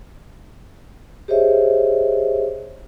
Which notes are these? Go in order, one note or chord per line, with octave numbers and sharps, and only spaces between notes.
G4 G#4 C5 C#5 D#5 E5